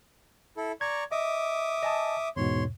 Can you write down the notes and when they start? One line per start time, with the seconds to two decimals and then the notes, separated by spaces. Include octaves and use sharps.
0.57 E4 A4
0.81 D5 A#5 C#6 G#6
1.12 D#5 E5 D6 D#6
1.83 D#5 G#5 A5
2.36 E2 G#2 B2 C#5 C6